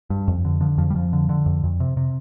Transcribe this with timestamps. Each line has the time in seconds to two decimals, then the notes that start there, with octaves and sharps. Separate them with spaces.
0.10 G2
0.28 F2
0.45 D3
0.61 D3 F3
0.78 F2 F3
0.90 G3
0.95 F2 F3
1.13 D3
1.29 D3
1.46 F2
1.64 F2
1.80 C3
1.97 C3